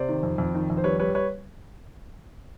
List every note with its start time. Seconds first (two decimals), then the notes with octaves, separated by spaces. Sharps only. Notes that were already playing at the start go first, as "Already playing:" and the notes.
Already playing: C3 C5 D5
0.09 D#3
0.23 F2
0.38 F2
0.54 D#3
0.70 F2
0.77 C5
0.84 G3 B4 C#5
1.00 G3 B4 C#5
1.15 B4 C#5